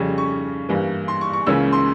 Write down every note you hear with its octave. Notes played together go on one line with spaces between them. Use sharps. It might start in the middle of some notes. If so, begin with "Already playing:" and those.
Already playing: F2 C#3 G3 C#4
C#6
G2 E3 G3 A#3
C6
C#6
C#6
C#2 C#3 E3 A#3 C#4 E6
C6